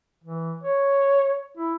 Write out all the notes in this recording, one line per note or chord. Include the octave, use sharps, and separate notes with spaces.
E3
C#5
E4